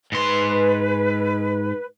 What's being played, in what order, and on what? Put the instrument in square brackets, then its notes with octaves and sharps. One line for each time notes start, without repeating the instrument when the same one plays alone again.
[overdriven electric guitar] G#2 C6 [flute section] B4